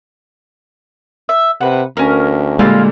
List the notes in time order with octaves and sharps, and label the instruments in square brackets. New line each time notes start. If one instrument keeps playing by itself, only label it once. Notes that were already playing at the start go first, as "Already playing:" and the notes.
[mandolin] E5
[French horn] C3 [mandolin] B4 F#5
[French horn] D2 [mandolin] C#4 A#4
[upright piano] A#2 D3 G3 [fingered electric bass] G#3 [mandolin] C4 F4